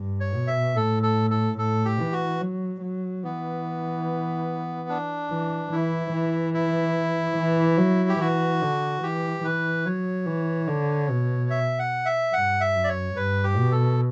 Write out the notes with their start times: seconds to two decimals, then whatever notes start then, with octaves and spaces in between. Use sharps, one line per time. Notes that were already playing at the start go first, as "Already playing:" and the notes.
Already playing: G2
0.20 C#5
0.34 B2
0.47 E5
0.76 A2 A4
1.03 A4
1.30 A4
1.58 A2 A4
1.85 G4
2.00 E3
2.13 F#4
2.41 F#3
2.81 F#3
3.24 E3 B3
4.89 D4
5.30 E3
5.72 E3 E4
6.12 E3
6.54 E4
7.37 E3
7.78 F#3
8.09 G4
8.19 E3 F#4
8.62 D3
9.03 E3 G4
9.43 E3 B4
9.86 F#3 C#5
10.26 E3
10.68 D3
11.10 B2
11.50 E5
11.79 F#5
12.05 E5
12.33 G2 F#5
12.61 E5
12.75 F#2
12.84 D5
12.89 C#5
13.16 G2 B4
13.44 G4
13.57 B2
13.72 A4